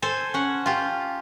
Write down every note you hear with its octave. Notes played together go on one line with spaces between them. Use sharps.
A4 C5 G#5
C#4 F#5
F4 G4